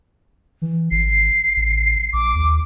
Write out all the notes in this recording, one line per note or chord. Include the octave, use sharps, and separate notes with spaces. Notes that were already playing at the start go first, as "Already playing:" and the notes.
E3
G#1 C7
A1
A#1 D6
D#2